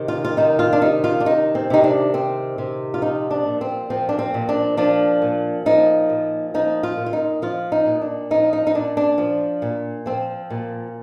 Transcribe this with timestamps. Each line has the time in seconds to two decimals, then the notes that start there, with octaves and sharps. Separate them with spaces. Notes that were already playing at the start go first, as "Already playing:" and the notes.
Already playing: C3 D#3
0.08 F4
0.25 F4
0.37 D#3 D#4
0.59 F4
0.73 D4
0.81 C3 D#4
1.04 F4
1.20 D4
1.26 D#3 D#4
1.55 C4
1.70 C3 D#4
1.84 D4
2.14 D#3 C4
2.58 C3
2.94 F4
3.02 F3 D#4
3.31 D4
3.46 A#2
3.61 C4
3.90 F3 C4
4.09 D4
4.19 C4
4.34 A#2
4.49 D4
4.77 F3 D4
5.22 A#2
5.66 F3 D#4
6.09 A#2
6.54 F3 D#4
6.83 F4
6.98 A#2
7.06 F4
7.13 D#4
7.42 F3 F4
7.72 D#4
7.86 A#2
8.01 D4
8.31 F3 D#4
8.53 D#4
8.67 D#4
8.75 A#2 D4
8.97 D4
9.18 F3
9.62 A#2
10.06 F3 C4
10.50 A#2